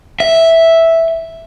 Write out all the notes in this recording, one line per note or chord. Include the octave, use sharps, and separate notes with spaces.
E5